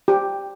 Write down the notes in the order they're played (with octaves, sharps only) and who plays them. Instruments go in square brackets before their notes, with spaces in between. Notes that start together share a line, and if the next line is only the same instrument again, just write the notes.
[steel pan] G4